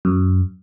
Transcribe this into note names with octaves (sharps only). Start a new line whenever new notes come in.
F#2